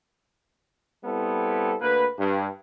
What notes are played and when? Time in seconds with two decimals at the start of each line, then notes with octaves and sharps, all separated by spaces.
1.04 G3 B3 C4 E4 A4
1.81 D2 A#3 B4
2.19 G2